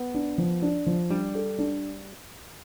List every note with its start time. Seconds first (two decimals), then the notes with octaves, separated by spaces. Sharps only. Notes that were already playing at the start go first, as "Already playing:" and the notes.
Already playing: B3
0.14 D4
0.38 F3
0.62 D4
0.86 F3
1.10 G3 D4
1.35 A4
1.59 D4